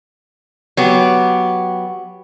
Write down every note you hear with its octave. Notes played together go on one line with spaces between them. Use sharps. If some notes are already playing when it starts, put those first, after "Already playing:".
F#3 B3 G4